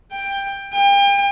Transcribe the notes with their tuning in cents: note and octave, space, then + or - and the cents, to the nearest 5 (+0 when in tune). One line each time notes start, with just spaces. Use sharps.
G5 +15
G5 +35